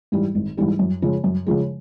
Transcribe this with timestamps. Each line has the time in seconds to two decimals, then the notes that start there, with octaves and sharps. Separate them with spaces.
0.12 G#2 E3 G3
0.35 G#1
0.57 G#2 E3 G3
0.79 F#2
1.02 C#3 F3 G#3
1.24 F#2
1.46 C#3 F3 G#3